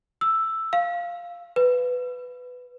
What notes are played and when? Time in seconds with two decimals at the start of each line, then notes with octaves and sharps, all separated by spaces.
0.21 E6
0.73 F5
1.56 B4